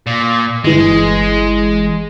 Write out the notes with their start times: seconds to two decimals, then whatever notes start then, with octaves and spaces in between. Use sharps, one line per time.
0.06 A#2
0.64 G1 E3 G#3